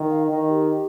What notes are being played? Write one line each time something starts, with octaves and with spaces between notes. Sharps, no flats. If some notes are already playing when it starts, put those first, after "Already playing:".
Already playing: D#3
F5
D#3 D#5
G4